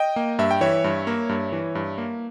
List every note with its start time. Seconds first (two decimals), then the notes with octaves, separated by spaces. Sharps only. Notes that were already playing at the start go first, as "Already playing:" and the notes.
Already playing: D#5 G5
0.16 A#3
0.39 G2 E5
0.51 G5
0.61 E3 C#5 E5
0.84 G2
1.07 A#3
1.29 G2
1.52 E3
1.75 G2
1.98 A#3